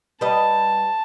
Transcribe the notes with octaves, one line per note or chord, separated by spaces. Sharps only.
G3 B4 D#5 A5